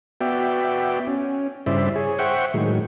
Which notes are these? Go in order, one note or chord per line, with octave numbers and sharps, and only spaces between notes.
B3 F#4 D5 E5 G5
C#4
G2 C#3 E4 C5 D5 E5
G#4 C#5
C5 E5 F#5 G5 C#6
A2 D#3 F#3 G#3